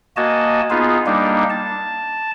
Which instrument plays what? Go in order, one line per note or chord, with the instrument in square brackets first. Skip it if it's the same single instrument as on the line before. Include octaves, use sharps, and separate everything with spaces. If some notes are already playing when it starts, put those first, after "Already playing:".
[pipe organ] A#3 F#4 D#5 G#5 A5
B3 D#4 F4 G#4
G3 A#3 D4 D#4
A5